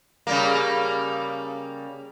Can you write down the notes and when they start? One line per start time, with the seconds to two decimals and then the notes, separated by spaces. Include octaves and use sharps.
0.27 C#3 G3 A#3